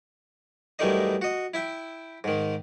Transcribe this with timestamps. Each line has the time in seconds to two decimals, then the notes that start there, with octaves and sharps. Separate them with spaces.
0.79 F#2 E3 G3 A3 D#4 D#5
1.22 F#4 D#5
1.54 E4 E5 G5
2.24 G#2 D#3